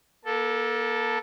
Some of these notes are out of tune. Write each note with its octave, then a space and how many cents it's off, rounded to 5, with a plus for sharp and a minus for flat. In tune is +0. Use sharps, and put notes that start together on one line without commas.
A#3 +35 A4 +0